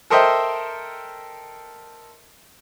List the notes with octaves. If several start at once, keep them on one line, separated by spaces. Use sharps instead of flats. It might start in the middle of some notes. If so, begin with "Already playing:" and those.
A4 A#4 C5 D#5 E5 G5